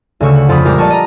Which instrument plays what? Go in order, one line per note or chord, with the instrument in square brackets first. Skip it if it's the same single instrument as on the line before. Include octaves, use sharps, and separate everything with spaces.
[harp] D2 C#3 C#6 E6
F#5
F2 F4 B5 D#6
A#1 G3 G#3 G4 A#4 D6
D5 D#5 A5 C#6 F6
D#5 A#5